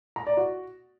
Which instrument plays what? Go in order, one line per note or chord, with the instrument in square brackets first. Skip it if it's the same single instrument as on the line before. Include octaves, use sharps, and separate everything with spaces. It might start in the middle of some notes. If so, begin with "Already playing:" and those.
[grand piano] A#5
D5
F#4